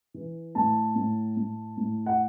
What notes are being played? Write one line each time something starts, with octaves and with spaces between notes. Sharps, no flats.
E3
A2 A5
A2
A2
A2
F#5